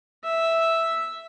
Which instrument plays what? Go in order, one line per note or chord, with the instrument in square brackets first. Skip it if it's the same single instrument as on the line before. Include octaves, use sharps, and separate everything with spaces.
[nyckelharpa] E5